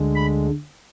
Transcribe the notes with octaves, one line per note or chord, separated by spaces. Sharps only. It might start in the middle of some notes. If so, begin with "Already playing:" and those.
Already playing: D2 D3 G#3
B5